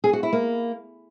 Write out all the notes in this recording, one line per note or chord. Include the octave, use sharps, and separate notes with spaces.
G#4
F#4
E4
A#3